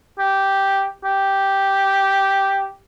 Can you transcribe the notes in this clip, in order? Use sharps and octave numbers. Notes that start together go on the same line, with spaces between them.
G4
G4